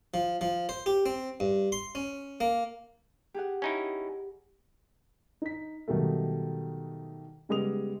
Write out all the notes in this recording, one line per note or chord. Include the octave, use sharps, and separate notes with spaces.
F3
F3
C5
G4
C4
G2
C6
C#4
A#3
G4 G#4 F#5
C#4 D#4 E4
D#4 B6
B2 D#3 F#3 G3 A3
C#3 G3 G#3 B3 D#6 F7